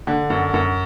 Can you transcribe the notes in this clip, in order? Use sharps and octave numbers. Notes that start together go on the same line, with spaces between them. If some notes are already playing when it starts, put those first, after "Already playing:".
D3
F#2
F#2